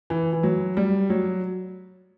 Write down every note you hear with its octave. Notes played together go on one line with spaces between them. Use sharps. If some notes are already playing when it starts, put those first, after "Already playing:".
E3
E3
F#3
G3
F#3